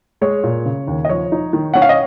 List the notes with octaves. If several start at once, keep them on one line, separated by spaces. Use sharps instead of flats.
G#3 C#5
A#2
C#3
D#2
D#5
F3 C#5
D#4
D#3
C#4 F#5
F5
D#5